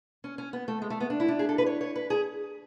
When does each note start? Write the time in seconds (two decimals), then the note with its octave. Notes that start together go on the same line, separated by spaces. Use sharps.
0.24 C#4
0.38 C#4
0.53 B3
0.68 A3
0.82 G#3
0.90 A3
1.00 B3
1.10 D4
1.20 E4
1.28 D4
1.39 G#4
1.49 A4
1.58 B4
1.66 C#5
1.81 C#5
1.96 B4
2.10 G#4